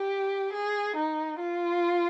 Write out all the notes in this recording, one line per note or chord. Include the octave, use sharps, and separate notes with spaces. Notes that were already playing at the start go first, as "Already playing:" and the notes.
Already playing: G4
G#4
D#4
F4